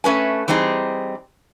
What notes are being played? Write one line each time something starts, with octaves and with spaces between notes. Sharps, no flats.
A3 C#4 B4 G#5
E3 G3 C4 D#4 G#4